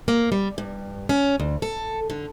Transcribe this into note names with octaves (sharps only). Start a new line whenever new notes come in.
A#3
G3
G2
C#4
D2
A4
D3